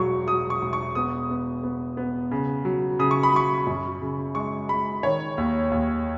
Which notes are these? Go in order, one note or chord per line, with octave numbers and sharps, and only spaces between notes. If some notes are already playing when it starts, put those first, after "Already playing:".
Already playing: E1 F#3 C#6
F#3 D#6
C#6
E1
C#6
B3 D#6
B3
B3
B3
C#3
F#3
C#3 D#6
C#6
B5
F#3 C#6
F#2
C#3
G#3 C#6
G#3 B5
D#3 C#5
D#2
D#2